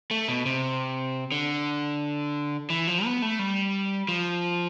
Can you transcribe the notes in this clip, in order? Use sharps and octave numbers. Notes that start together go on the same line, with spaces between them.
A3
B2
C3
D3
E3
F3
B3
A3
G3
F3